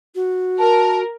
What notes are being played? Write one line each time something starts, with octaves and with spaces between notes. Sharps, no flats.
F#4
A#4 A5